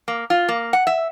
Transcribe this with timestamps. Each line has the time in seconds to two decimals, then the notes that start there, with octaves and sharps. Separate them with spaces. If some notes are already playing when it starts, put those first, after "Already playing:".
0.08 A#3
0.30 F4
0.49 A#3
0.73 F#5
0.87 E5